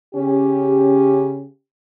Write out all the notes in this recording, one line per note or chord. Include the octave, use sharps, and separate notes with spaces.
C#3 C#4 G4